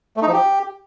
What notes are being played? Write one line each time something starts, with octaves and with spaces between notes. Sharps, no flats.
A3
D#4
F3
G4